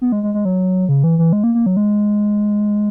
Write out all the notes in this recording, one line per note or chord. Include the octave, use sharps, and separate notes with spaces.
B3
G#3
G#3
G#3
F#3
C#3
E3
E3
G#3
A#3
A#3
F#3
G#3